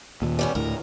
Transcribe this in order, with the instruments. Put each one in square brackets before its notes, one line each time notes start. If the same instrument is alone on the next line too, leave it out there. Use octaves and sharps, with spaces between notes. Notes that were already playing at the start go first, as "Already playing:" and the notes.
[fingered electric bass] D#2 A#2
[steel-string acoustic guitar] G3 B3 C#4
[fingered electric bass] D2 A2 [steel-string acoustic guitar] A#4